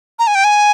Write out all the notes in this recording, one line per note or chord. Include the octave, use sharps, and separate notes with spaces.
A#5
G#5
G5
G#5